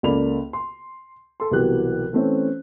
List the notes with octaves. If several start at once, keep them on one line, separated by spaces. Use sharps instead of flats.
C#2 A#3 A4 D5 B5 F7
C6
A4 C6
C2 B2 E3 F#3 G4 F#6
E3 A3 C4 C#4